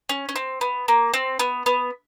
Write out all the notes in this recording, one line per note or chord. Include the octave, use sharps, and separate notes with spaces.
C#4
C#4
C4
B3
A#3
C4
B3
B3